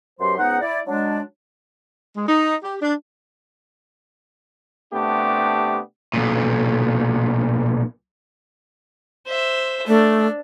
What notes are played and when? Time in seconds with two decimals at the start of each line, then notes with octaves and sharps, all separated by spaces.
0.20 F#2 B2 F#3 G4 C5 C6
0.38 C#2 G#2 B3 D#4 F#5
0.61 E4 D5
0.87 F#3 G#3 D4
2.16 G#3
2.29 D#4
2.64 G4
2.82 D4
4.93 C3 A3 B3 D4 G4
6.14 B1 A#2
9.27 C5 E5
9.87 A3 D4